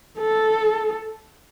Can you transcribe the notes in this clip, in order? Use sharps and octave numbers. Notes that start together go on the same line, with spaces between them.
A4